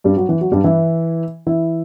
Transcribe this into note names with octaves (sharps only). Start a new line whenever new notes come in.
G2 G3
F#3
E3
F#3
G2 G3
E3 E4
E3 E4